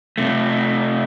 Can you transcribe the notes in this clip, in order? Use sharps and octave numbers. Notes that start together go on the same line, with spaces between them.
C3 A3